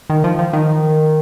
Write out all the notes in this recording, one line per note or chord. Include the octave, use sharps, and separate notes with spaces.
D#3
F3
F3
D#3